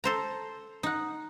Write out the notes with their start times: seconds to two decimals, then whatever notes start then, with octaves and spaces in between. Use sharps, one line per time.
0.04 A4 C5 A#5
0.83 D#4 F#5